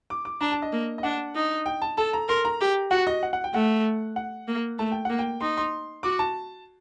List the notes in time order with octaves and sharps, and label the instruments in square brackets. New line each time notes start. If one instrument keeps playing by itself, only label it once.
[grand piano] D6
D6
[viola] D4 [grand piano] A#5
[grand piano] A5
D#5
[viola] A#3
[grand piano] D#5
[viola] D4 [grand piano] F#5
[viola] D#4
[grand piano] G5
A5
[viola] A4 [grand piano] A5
[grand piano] A#5
[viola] A#4 [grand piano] C6
[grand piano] A#5
[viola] G4
[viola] F#4 [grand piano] F#5
[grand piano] D#5
F#5
F#5
G5
[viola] A3 [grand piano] F#5
[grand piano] F#5
[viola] A#3
[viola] A3 [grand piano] A5
[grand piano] G5
[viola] A#3 [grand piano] F#5
[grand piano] G5
[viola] D#4 [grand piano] C6
[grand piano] C6
[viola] F#4 [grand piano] D6
[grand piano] A5